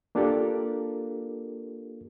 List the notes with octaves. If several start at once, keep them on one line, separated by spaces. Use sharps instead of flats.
A#3 D4 F4 G4 A4 A#4